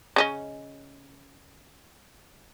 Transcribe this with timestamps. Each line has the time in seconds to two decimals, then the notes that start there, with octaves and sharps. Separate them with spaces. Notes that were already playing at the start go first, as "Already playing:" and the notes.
0.16 C#3 C#4 D#5